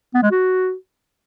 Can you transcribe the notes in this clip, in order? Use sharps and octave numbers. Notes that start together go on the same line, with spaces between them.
B3
G#3
F#4